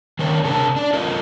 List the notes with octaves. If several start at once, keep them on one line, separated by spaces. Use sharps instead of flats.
D#3 D4 A#4 C#5
C3 D4 G#4 A#4 C#5 A5
D4 D5
F4 A4 A#4 D#5